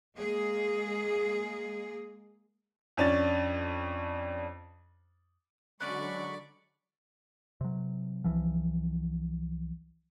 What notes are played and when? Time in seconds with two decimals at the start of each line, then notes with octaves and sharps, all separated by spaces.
0.17 G#3 A#3 G#4
2.97 F2 C#4 D4 A6
5.81 D3 F#3 G#3 C#4 D5 B5 C#6 F#6
7.61 C3 F#3
8.24 C2 E3 F3